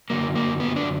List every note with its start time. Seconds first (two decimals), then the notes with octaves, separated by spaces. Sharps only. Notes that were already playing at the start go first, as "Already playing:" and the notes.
0.10 F#2 D3 F#3 A#3
0.36 A#3
0.60 B3
0.76 D4